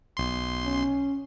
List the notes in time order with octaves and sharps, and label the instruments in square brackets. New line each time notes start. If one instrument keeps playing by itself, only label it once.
[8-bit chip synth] B1 C6
[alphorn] C#4